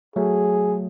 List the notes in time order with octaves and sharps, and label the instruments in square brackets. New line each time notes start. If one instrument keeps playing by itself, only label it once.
[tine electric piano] F#3 A3 [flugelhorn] G#4